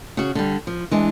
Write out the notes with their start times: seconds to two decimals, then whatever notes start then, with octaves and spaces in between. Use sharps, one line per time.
0.17 C#3 F#4
0.35 D3 G3
0.67 F3
0.91 E3 G#3 D4